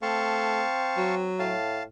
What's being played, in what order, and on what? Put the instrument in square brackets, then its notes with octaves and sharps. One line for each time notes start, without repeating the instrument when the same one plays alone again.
[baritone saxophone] A3 [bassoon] C4 [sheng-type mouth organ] F5 A5 C#6
[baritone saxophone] F#3
[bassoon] A2 [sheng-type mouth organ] F5 A5